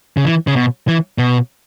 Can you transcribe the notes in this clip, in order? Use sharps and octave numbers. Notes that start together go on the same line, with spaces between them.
C#3
E3
C#3
B2
E3
B2